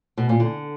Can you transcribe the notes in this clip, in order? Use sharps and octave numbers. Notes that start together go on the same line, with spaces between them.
B2
A#2
D3